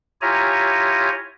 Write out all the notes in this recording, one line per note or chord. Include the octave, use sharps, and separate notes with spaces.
E4 F4 G4 C#5 G#5 A#5